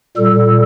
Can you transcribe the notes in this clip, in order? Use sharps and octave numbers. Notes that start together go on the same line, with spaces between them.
A#2 G3 A4